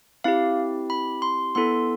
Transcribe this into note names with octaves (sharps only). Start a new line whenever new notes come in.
C4 E4 G4 F5
B5
C6
B3 E4 A4 C6